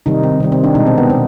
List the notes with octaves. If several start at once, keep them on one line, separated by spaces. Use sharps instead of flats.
C3 D#3 G3 D#4
C4
C3 D#3 G3
C4
D4
B2 G#3 D#4
C4
B3
B2 C4